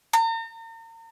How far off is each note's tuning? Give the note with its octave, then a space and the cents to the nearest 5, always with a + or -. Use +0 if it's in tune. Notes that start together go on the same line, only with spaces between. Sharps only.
A#5 -40